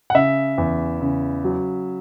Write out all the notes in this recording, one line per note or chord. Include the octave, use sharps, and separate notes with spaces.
F#5
C#3 E5
E2
C#3
F#3